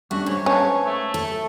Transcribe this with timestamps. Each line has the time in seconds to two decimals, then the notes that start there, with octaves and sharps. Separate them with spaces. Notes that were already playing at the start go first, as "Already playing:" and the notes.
0.11 G3 A3 C#4 D4 F#4
0.26 G#2 C#5
0.46 C#4 B4 C#5 F5 A5
0.86 A3
1.14 A4